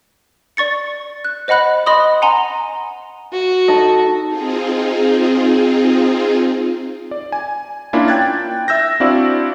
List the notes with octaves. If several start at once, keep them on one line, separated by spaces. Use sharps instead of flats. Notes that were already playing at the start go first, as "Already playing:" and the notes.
D5 C#6 A6 C#7
F#6
C5 D#5 F#5 B5 F#6
D#5 B5 C6 D#6
F#5 G#5 A#5 C6
F#4
D#4 A4 D#5
C4 D#4 F4 G#4
D5
G#5
A#3 C#4 D4 E4 F4
G5 F#6 G#6 A6
E5 E6 G6 A#6
C4 D4 E4 F#4 D5 F5